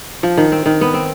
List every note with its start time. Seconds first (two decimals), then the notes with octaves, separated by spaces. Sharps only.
0.23 F3
0.37 D#3
0.52 C4
0.66 D#3
0.81 B3
0.94 C4